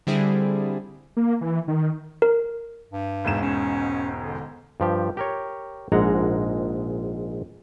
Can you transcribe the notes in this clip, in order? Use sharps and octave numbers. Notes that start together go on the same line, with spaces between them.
D3 G3 C4 E4 G#4
A#3
E3
D#3
A#4
G2
E1 G#2 E7
C#4
D3
G2 F3 G4
G4 A#4 C#5
A#1 G#2 G#3 F#5 A#5